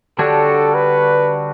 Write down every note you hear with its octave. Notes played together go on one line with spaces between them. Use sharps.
D3 G3 D4 F#4 A4 C#5
B4